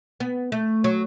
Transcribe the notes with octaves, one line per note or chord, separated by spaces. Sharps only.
B3
A3
F#3